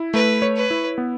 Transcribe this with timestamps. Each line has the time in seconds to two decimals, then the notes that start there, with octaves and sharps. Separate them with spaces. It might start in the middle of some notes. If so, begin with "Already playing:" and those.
Already playing: E4
0.14 A3 B4
0.42 C#5
0.56 B4
0.71 E4
0.98 B3